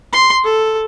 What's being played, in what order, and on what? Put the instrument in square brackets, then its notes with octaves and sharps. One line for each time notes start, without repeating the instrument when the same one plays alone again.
[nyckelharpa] C6
A4